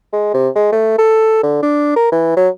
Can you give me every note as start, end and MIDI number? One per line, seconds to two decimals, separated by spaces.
0.13 0.34 56
0.34 0.48 48
0.55 0.72 56
0.72 0.95 57
0.98 1.40 69
1.43 1.62 50
1.63 1.96 62
1.96 2.09 70
2.12 2.34 52
2.37 2.48 54